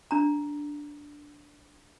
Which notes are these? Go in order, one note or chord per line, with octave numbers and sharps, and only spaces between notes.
D4 A#5